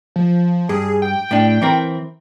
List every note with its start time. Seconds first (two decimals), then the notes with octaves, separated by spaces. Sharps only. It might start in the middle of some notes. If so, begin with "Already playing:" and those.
0.16 F3
0.69 G2 G#4
1.02 G5
1.31 A2 D4
1.62 E3 C4 A#4